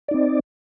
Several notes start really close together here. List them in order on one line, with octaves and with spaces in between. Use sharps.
D5 D#4 C4